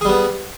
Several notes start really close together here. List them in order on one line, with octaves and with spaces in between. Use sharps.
G#4 G3 B3